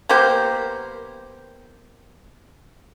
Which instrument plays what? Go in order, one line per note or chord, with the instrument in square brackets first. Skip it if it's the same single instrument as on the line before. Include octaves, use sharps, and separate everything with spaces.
[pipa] A#3 B3 G4 C5